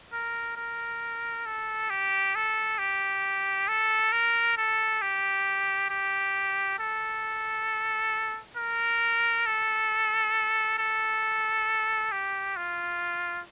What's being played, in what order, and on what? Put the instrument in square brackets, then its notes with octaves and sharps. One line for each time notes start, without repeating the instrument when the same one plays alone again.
[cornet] A#4
A#4
A4
G4
A4
G4
A4
A#4
A4
G4
G4
A4
A#4
A4
A4
G4
F4